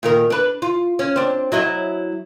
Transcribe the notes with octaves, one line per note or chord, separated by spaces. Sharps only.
A#2 D#3 A#4
D4 B4
F4
C#4
C4 D4
F#3 E4 D#5